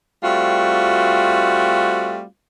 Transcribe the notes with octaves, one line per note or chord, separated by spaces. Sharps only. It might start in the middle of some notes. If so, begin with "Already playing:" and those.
G3 A3 C4 F4 F#4